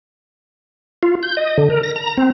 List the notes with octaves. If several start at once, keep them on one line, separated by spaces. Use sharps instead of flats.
F4
G6
D#5
D3
A#4
A#6
A#5
C4